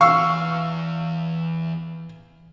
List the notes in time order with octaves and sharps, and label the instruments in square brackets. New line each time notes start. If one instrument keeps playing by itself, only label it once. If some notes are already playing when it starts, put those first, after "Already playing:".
[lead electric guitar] E2 [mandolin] F5 [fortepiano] C#6 E6